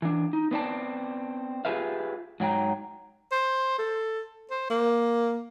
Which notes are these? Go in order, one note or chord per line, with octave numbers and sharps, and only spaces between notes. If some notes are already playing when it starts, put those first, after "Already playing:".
E3 D4
D#4
B3 C4 D5 A5
F4 G4 G#4 B4 E5 F5
G#2 F#3 G5 A#5
C5
A4
C5
A#3